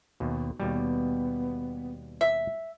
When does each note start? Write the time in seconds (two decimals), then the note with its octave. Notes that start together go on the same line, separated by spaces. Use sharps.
0.20 D#2 B2
0.60 D#2 B2 G3 B3
2.21 E5